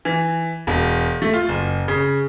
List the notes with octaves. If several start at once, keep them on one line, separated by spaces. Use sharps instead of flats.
E3
E1
A3
F4
F#1
C#3